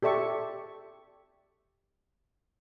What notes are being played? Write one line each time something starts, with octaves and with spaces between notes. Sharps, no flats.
G4 A4 D5 E5 C#6